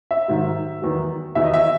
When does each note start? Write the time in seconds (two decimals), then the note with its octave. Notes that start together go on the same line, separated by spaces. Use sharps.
0.11 E5
0.28 G#2 D#3 F#3
0.82 E2 D#3 F#3
1.35 E2 D#3 F#3 E5
1.44 D#5
1.54 E5